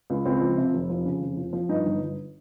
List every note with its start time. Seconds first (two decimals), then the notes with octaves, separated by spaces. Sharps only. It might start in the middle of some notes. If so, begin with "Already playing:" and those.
0.10 C#2
0.25 C#2 C4
0.41 F3
0.57 C3
0.73 F1
0.90 F3
1.05 C#3
1.21 F1
1.37 F3
1.53 F3
1.69 G2 D#4
1.85 G1
2.01 G1